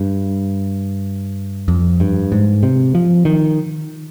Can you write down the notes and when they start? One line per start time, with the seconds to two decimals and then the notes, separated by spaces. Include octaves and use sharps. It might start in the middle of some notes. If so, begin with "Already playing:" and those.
Already playing: G2
1.68 F2
2.00 G2
2.32 G#2
2.63 C3
2.95 F3
3.25 D#3